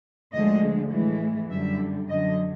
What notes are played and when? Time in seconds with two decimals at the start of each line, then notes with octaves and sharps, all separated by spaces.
0.33 D2 D3 F3 G#3 D#5
0.92 A2 E3 G#3
1.51 F#2 D3 G3 E5
2.10 F#2 D3 F#3 D#5